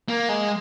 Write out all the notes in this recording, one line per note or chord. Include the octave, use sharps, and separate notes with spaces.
A#3
G#3